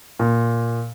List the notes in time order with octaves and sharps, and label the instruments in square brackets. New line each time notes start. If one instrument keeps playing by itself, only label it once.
[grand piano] A#2